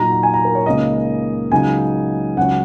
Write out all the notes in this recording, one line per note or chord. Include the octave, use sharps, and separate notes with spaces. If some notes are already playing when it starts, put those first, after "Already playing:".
Already playing: A#2 F#3 D#4 A#5
A#5
G#5
A#5
A#4
C#5
C#2 C#3 A#3 D#4 D#5
C#2 C#3 F#3 D#4 G#5
C#2 C#3 F#3 C#4 F#5